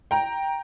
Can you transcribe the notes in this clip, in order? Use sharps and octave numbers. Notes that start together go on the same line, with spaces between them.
G5 A#5